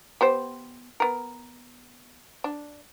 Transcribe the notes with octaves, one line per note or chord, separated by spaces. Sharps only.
B3 G4 C5
B3 A#4
D4